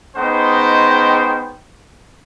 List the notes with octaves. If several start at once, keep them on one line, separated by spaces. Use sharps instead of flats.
G#3 B3 C#4 D#4 C5 G5